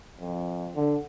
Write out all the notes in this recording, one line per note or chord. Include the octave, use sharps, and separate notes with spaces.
F2
D3